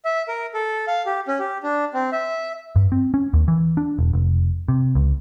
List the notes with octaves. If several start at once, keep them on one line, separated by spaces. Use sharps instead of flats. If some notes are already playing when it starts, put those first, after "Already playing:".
E5
A#4
A4
F5
G4
C#4
G4
D4
C4
E5
G2
C4
C#4
D#2
E3
D4
E1
F1
C3
C#2